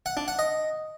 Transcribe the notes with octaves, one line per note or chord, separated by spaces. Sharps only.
F#5
D4
F#5
D#5